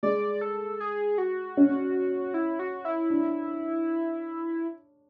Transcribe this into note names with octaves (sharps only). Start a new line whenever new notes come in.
G#3 D5
A4
G#4
F#4
C#4
E4
F#4
E4
D4